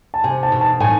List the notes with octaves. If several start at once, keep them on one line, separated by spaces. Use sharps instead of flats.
A5
C3 G#5
A5
B2
A5
A2 G#5